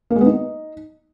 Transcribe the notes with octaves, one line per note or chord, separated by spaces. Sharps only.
A#3
G#3
B3
D#4